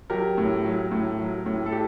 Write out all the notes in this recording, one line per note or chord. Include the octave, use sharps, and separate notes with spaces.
F#3 G4 A#4
A2
F#3
A2
F#3
A2
A4
G4